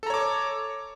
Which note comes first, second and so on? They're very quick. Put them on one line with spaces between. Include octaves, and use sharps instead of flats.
A4 A#5 C#5 D6